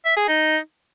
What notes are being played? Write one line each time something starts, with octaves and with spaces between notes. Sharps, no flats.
E5
G#4
D#4